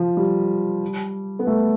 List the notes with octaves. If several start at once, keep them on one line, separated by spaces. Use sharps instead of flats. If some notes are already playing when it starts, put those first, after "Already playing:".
Already playing: F3
G3
B3
A3